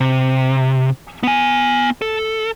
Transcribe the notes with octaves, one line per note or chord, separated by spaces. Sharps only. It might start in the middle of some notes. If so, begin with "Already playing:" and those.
C3
B3 G#5
A4